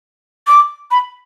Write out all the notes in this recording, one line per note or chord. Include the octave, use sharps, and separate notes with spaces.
D6
B5